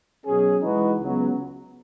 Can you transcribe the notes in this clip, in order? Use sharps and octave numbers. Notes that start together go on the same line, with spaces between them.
B2 F#3 C#4 G#4
E3 G#3 D#4 F#4 B4
C#2 C#3 F#3 B3